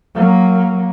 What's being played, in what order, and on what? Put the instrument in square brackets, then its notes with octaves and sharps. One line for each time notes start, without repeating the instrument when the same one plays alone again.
[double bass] F#3 A#3